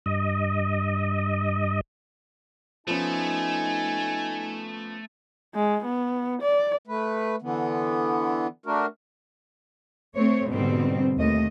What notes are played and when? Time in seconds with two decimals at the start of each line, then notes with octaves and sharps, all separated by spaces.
0.06 G2 D#5
2.87 F3 A3 B3 C#4 D#4 G#5
5.55 G#3
5.85 B3
6.42 D5
6.88 A3 B4
7.42 D3 E3 B3
8.66 A3 D4 F#4 A#4
10.15 A3 C4 C#5
10.48 G#2 B2 D3 G3 C4
11.17 D#2 A3 D#5